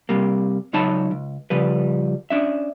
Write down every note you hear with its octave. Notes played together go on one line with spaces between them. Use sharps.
C3 G3 A#3
C#2 F#3 D#4 C#5 A5 B5
C#2
C#3 F3 G3 B4
C#4 D4 E5